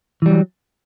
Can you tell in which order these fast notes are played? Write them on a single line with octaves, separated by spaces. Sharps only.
E3 G3 F#3